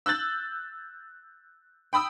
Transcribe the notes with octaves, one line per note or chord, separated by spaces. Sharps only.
E6 F#6 G6 A6 F#7
G5 B5 D#6 E6